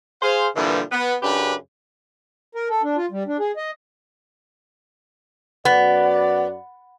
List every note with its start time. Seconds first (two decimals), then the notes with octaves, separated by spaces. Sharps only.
0.22 G#4 C5 F5
0.56 G2 A#2 D3 E3 F3 G3
0.92 B3
1.23 F#2 C#3 D4 G4 B4
2.55 A#4
2.70 A4
2.83 D4
2.97 F4
3.11 G3
3.27 D4
3.39 G#4
3.57 D#5
5.65 F#2 B3 F#4 D5